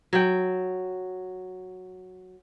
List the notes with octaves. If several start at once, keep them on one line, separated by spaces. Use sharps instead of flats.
F#3 G5